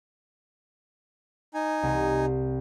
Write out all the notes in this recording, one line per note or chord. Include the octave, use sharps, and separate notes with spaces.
D#4 G#5
C2